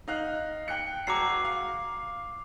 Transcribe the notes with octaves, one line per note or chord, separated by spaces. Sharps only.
D#4 F5 F#6
G5 F#6 C#7
E1 F#4 A#5 D6 C7
F5